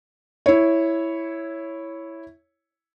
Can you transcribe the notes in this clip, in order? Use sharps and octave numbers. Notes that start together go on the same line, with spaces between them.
E4 C#5